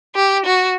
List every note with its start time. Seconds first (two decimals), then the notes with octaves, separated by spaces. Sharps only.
0.16 G4
0.46 F#4